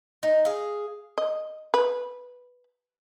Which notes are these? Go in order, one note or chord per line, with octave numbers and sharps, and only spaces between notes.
D#4
G#4 F5
D#5
B4